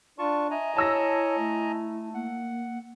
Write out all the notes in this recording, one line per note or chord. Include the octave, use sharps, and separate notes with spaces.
D4 F4 D5 A5 C#6
D#5 E5 G#5 A#5
E4 C#5 A5 E6 A#6
A3
A#3 F#5